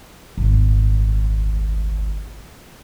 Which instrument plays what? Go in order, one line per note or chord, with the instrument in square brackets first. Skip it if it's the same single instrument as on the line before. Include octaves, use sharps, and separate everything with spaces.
[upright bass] D#1 G#1